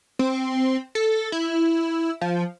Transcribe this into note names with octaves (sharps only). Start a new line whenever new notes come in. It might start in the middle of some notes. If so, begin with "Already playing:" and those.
C4
A4
E4
F3